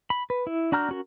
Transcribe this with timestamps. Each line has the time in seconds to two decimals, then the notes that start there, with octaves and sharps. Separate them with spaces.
0.10 B5
0.30 B4
0.47 E4
0.72 D4 F#4 A#5 F6 G6
0.89 C#4 F#4 A#4